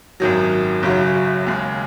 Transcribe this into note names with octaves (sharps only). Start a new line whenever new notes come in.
G#1 F#2 D#3 F#3
F#1 F#2 C#3 F#3
D#2 C#3 G#3